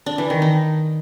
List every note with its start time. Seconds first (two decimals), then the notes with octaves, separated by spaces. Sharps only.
0.06 D4
0.18 E3
0.30 D#3
0.42 D#4